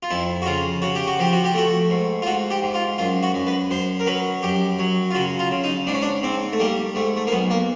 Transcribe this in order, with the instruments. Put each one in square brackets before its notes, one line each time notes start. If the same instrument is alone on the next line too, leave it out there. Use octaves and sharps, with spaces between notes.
[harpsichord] F4
F2 E4
F#4
C#3 F4
C#3 F#4
G4
F#4
F3 G4
F#4
G4
A3 F#4
G#2
F4
G#2 F#4
G4
G#2
F4
F#2 F4
F#4
F#2
B4
F#2 C5
A#4
F#3 B4
F#2 G4
F#3
F4
C#3 F#4
F4
C#3
D#4
G#2 D4
C#4
D4
G#2 C4
A3
G3 A#3
G#2 A3
A3
A#3
B1 B3
A#3